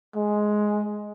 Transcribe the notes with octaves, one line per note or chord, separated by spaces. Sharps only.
G#3